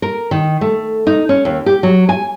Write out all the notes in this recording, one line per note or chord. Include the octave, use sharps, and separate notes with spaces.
A#4
D#3
A3
D#4
C#4
D#2
G4
F#3
G#5